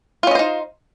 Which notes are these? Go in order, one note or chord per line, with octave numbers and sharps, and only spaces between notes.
C#4 D#4 F4 C5 D#5